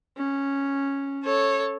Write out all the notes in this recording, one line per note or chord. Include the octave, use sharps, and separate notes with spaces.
C#4
A4 C#5